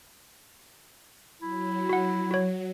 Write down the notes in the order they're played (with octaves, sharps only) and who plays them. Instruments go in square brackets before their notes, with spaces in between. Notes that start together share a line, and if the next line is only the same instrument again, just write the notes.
[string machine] F#3 [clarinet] E4
[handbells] F#4 F#5
F#4 C#5